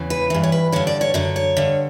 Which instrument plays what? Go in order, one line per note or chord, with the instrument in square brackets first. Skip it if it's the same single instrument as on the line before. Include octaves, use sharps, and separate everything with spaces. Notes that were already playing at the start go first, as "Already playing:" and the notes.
Already playing: [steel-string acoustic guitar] E2 C#3 E3
B4
G2 E3
C#5
B4
G2 D3 C#5
D5
C#5
F#2 D3 C#5
C#5
G2 D3